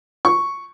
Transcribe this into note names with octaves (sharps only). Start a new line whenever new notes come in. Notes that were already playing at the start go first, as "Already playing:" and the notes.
C#6